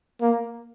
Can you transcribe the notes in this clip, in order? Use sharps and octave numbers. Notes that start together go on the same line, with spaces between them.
A#3